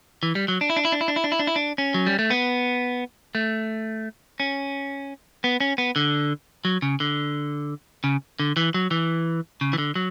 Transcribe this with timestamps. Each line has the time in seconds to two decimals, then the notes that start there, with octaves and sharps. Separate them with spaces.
0.23 E3
0.35 G3
0.48 F#3
0.61 D4
0.70 E4
0.76 D4
0.85 E4
0.92 D4
1.01 E4
1.08 D4
1.16 E4
1.24 D4
1.32 E4
1.39 D4
1.47 E4
1.56 D4
1.78 C#4
1.94 F#3
2.06 G3
2.19 A3
2.30 B3
3.35 A3
4.40 C#4
5.44 B3
5.60 C#4
5.78 B3
5.96 D3
6.65 F#3
6.82 C#3
7.00 D3
8.04 C#3
8.40 D3
8.57 E3
8.74 F#3
8.91 E3
9.61 C#3
9.73 E3
9.78 D3
9.96 F#3